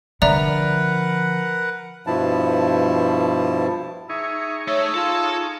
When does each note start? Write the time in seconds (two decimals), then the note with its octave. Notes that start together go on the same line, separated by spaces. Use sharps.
0.22 D3 F3 A#4 B4 D5 E5 F#5 A#5
2.07 G2 B2 F3 E4 A5
4.09 D#4 G#4 E5 C#6
4.68 A3 C#5 E6
4.94 F4 A4 A5